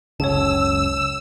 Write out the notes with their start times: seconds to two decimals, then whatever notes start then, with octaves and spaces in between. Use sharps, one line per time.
0.20 F#1 C#2 C#3 C#5 A5 E6